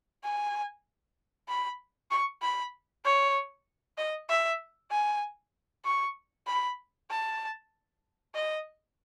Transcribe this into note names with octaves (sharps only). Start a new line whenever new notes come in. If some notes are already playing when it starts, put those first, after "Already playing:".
G#5
B5
C#6
B5
C#5
D#5
E5
G#5
C#6
B5
A5
D#5